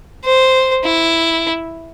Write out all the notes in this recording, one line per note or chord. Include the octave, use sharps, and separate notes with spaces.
C5
E4